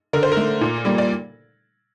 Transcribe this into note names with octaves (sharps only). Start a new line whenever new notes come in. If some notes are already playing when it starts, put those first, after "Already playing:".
D3 A#4
C5
A#4
A3
A#2
G3 A#3
D5